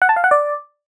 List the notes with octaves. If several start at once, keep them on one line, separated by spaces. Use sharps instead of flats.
F#5
A5
F5
F#5
D5